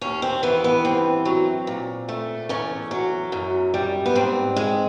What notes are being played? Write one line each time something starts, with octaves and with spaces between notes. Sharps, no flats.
D#2 C#4
C4
E3 B3
B3
G2 C4
F#3
A#2
A3
E2 C#4
F#3
F#2
G3
B3
G#2 C4
G#3